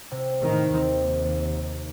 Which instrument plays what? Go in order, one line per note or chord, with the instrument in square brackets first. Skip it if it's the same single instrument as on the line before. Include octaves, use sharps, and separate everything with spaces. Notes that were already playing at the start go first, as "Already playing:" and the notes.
[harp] C3
[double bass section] A2 D#3
[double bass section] D#2 [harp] C4 D#4